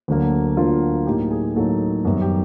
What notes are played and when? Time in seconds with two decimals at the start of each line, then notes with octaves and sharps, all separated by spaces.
0.08 D2 D3 F#3 A#3
0.57 D2 D3 F#3 A#3 F4
1.06 A2 F#3 A#3 D#4 G4
1.31 G#4
1.55 A2 F#3 A#3 D#4 A4
2.05 F#2 D#3 G3 B3
2.21 G4